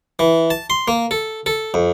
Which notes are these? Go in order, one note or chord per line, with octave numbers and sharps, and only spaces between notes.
E3
A5
C6
A#3
A4
A4
F2